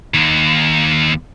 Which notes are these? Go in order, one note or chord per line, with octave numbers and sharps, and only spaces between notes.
D#2 D#3